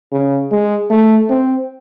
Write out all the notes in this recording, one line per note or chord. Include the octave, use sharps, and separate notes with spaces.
C#3
G#3
A3
C4